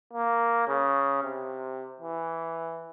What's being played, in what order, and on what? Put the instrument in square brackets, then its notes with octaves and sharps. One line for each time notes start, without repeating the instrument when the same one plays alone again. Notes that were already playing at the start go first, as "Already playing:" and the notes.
[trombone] A#3
C#3
C3
E3